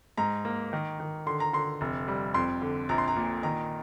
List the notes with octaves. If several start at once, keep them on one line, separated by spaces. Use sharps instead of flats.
G#2 A#5
A#3
D#3
D#3
D3 C6
A#5
D3 C6
F1
G3
F2 C6
D3
A#1 A#5
C6
A#5
A#2
D#3 A#5